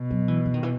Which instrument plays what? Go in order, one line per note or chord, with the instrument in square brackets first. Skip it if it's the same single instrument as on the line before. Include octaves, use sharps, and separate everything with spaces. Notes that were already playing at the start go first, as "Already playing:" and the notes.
Already playing: [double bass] B2
[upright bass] F#3
E3
E3
D#3
E3